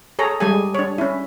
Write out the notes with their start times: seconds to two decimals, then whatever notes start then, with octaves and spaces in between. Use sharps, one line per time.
0.19 G#4 A4 C#5 A#5
0.40 G3 G#3 G#4 A4 G#5
0.75 D4 C#5
0.98 C#4 E4